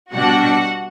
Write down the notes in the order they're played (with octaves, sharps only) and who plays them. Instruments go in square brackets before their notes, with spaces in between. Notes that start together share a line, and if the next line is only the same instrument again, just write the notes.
[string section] B2 G3 D4 F#4 F#5